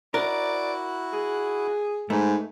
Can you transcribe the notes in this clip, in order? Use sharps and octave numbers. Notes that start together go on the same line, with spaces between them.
E4 F#4 A#4 D5 F#6
G#4
G#2 A3 D#4 B4